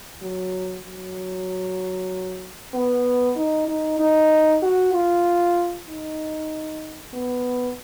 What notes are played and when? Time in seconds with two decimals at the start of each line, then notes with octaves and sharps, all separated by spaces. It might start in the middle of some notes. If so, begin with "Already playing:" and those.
0.22 F#3
0.85 F#3
2.74 B3
3.36 D#4
3.68 D#4
4.00 D#4
4.63 F#4
4.93 F4
5.89 D#4
7.13 B3